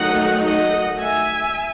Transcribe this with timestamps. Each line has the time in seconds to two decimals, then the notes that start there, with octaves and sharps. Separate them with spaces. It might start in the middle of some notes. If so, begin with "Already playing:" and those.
Already playing: D#3 F#3 A3 D#4 D#5 F#5
0.45 D#5 F#5
1.00 E5 G#5